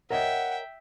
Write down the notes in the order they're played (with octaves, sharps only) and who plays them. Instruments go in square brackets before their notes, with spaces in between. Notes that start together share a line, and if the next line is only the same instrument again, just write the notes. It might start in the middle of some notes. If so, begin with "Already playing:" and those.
[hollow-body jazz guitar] A#4 C#5 D#5 [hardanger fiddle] E5 G5 [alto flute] F#5